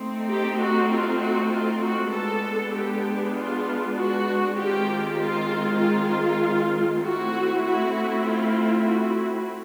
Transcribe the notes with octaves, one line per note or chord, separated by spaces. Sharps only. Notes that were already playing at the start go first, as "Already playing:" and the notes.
Already playing: A3 C4 D#4
G4
F#4
F4
F#4
F4
F#4
G#3 B3 D4 A4
G4
F4
F#4
D#3 G#3 C4 F4 G4
F4
F4
A3 C4 E4 F#4
F#4
F4
F#4